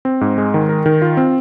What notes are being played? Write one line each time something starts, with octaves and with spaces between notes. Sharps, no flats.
C4
G#2
G#3
D#3
A#4
D#3
F4
C4